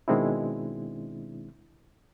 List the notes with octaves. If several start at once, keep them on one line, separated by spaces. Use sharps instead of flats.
B2 D#3 G#3 C4 D4 E4